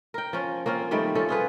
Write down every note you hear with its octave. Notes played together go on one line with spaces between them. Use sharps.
A#4 G5
F3 C#4
A#3 C4 C#4 F4
D#3 G3 A3 D5
F3 C#4 A4
F4 G#4 B4